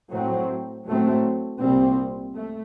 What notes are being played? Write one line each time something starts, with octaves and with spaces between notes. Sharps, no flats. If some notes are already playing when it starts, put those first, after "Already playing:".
A2 F#3 A3 C4
A2 F#3 A3 C4
C2 A#2 G3 C4
A3